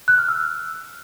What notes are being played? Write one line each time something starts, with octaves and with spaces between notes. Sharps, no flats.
F#6
F6
E6